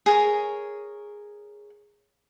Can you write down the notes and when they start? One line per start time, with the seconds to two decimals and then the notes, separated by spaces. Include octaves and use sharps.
0.06 G#4 A#4 C#5